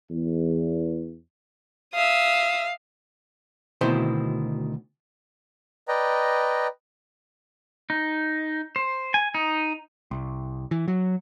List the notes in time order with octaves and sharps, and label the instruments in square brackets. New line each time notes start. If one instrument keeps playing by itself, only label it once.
[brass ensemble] E2
[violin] E5 D#6 [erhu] F5
[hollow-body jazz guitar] D2 B2 D#3 C4 E4 C5
[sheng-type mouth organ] B4 D5 D#5 G5 A#5
[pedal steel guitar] D#4
C5
G#5
D#4
[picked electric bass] C2
E3
F#3